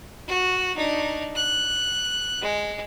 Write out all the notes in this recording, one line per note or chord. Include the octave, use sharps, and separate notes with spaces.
F#4
D4 D#4
F#6
G#3